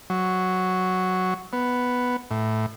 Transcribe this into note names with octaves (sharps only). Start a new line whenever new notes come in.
F#3
B3
A2